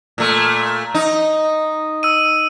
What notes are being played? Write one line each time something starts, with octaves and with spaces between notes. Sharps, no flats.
A#2 A3
D#4
E6 D#7